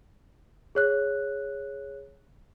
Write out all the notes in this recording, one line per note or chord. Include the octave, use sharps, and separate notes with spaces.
G#4 C#5 F#6